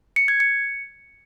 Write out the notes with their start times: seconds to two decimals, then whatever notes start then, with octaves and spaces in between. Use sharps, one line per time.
0.16 C#7
0.28 G#6
0.40 C#7